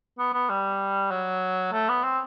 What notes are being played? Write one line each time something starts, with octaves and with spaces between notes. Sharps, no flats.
B3
B3
G3
F#3
A3
B3
C4